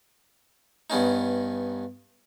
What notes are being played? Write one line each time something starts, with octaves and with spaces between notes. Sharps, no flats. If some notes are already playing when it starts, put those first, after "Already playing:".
G2 B3 C#4 D#4